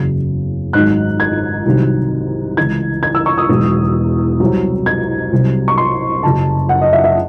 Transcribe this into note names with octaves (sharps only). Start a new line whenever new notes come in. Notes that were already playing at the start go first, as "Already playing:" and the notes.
Already playing: F#1 E2 C#3 F#3
G#1 G#2 D#3 F#3 F#6
G#6
C2 C3 D#3 F#3
C#2 C#3 E3 G#6
G#6
E6
C#6
D#6
E1 E2 D#3 F#3
C2 C3 F#3
G#6
C2 C3 F#3
C#6
C6
F#1 F#2 C#3 F#3 A5
F#5
D#5
E5
E5